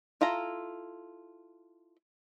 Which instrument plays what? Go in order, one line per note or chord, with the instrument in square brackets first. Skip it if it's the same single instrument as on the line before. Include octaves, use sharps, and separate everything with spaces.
[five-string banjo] E4 F4 A4 A#5